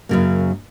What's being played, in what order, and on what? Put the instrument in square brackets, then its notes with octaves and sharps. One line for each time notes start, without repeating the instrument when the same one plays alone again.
[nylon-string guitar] F#2 C#3 F#3 A#3